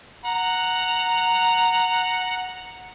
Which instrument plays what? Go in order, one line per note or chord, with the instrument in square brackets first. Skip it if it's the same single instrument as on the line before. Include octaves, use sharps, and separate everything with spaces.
[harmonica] F#5 A#5